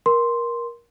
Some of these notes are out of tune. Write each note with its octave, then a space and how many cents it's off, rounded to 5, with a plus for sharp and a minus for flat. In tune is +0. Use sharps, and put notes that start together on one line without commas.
A#4 +20 C6 +0